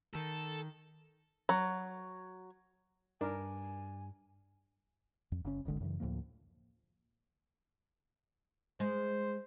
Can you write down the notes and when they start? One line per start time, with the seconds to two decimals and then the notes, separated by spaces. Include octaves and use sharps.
0.15 D#3 A4
1.49 F#3
3.21 G2 D4 A#4 G#5
5.32 F2
5.45 F#1 C#3 C#4
5.65 D1 G#1 D3 G#3
5.80 F#2 C#3 E3
6.00 D2 A2 F3 A#3
8.80 G#3 C5